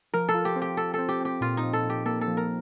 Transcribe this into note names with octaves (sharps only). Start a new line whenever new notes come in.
F3 A#4
A4
F4
G4
C4
G4
C4 A4
C4 A4
G4
C4 G4
A#2 F4
D#4
F3
A4
A#2
G4
A#3 A4
A4
F3
A#4